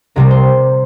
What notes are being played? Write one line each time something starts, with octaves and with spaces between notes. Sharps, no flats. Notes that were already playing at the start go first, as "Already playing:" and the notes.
C2 C3 G3 A#4
C5